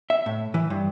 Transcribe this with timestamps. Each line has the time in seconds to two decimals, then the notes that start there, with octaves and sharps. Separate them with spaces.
0.10 E5
0.26 A2
0.54 E3
0.70 G2